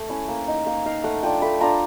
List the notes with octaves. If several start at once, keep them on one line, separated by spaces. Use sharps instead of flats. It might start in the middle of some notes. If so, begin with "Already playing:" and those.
Already playing: A3
C#4 E4
A#3
D#4
A#3 F5
D#4 F5
A3 F#5
D4 F4 G5
A3 B5
D4 F4 A#5